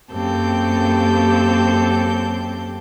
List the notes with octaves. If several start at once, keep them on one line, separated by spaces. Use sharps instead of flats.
F#2 A#3 C4 G4 A4 G6